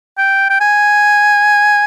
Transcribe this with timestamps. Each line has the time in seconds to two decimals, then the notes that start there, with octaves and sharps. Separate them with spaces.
0.18 G5
0.50 G5
0.61 G#5